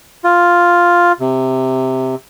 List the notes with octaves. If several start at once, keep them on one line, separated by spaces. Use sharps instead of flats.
F4
C3